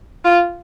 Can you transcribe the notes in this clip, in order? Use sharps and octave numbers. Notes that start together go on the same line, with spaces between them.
F4